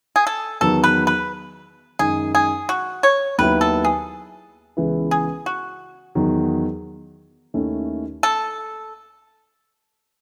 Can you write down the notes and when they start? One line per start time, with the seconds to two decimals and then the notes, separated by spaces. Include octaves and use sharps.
0.16 G#4
0.27 A4
0.61 E2 D#3 F#3 B3 A4
0.84 B4
1.07 B4
1.99 F#2 D#3 G#3 D#4 G#4
2.35 G#4
2.69 F#4
3.03 C#5
3.38 D#2 D#3 F#3 B3 E4 B4
3.61 A4
3.84 G#4
4.77 C#2 C#3 E3 B3 E4
5.11 G#4
5.46 F#4
6.15 E2 D#3 F#3
7.54 D#2 D#3 A3 C#4 E4
8.23 A4